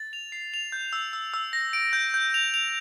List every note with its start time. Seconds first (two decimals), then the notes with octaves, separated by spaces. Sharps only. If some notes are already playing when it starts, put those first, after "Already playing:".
Already playing: A6
0.13 F7
0.32 C7
0.54 F7
0.72 G6
0.93 E6
1.13 E6
1.34 E6
1.53 A#6
1.73 D7
1.93 G6
2.14 G6
2.34 F7
2.54 F7